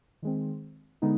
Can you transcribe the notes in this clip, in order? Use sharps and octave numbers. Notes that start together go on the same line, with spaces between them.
D#3 G#3 C4
D3 G#3 B3 D#4